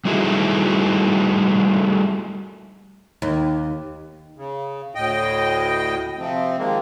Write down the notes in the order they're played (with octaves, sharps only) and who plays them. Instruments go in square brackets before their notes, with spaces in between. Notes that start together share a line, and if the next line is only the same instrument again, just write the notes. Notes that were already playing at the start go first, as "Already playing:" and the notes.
[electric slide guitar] G3 A3 D#4 E4 F#4 G#4
[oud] D#2
[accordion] C#3
D2 A2 D#5 G5
C3 F3 C4
D#3 F3 G#3 A#3